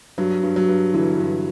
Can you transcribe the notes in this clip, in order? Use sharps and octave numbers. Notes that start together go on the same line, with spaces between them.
G2 F#3
G2
F#3
G2
D3 E3
G2